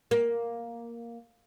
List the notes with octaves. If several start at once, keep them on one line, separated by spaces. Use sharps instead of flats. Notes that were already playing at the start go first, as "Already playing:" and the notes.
A#3